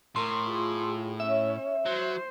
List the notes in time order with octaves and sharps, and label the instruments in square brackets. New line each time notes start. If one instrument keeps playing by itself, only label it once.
[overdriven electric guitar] A2 [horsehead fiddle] A#4 [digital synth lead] C6
[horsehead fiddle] F4 G#4
[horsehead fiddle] C#4 C#5 [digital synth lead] E5
[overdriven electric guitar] F#3 [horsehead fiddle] C5